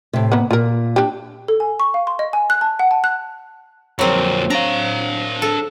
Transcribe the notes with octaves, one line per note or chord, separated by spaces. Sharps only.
A2 C3
A#3 B3
A#2 F4 A#4
D4 G4
A4
G#5
C#6
F5
C6
D#5
G#5
F#6
A5
F#5
A5
F#6
F2 F#3 A#3 C4
D4 F5 A#5
A4